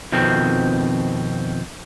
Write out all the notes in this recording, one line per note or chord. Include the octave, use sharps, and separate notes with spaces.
F2 B2 D#3 C4